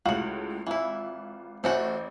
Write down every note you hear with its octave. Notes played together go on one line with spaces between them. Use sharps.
C#2 A2 F#4 F5 F#5
G#1 E3 E4 F4
A1 A3 C#4 F#4 C5